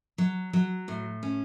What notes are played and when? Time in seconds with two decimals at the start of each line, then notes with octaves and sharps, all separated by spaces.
0.18 F#3
0.53 F#3
0.88 A2
1.23 C#4